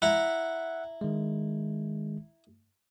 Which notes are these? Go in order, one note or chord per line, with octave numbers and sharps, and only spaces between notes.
E4 E5 F#5 A#5
D#3 G#3